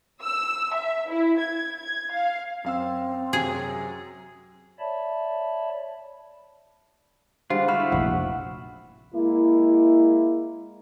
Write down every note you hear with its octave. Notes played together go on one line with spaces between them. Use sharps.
E6
E5
E4
G#6
G#6
F5
F#2 C4 F5 E6
F#2 C3 F#3 G#4
C#5 D5 E5 A5 B5
D3 G3 G#3 F4 C5 F5
E4 F#4 C5 B5 F6
F1 A#1 F#5
G#3 A#3 E4